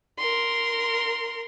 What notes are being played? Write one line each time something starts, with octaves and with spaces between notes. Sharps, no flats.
A#4 C6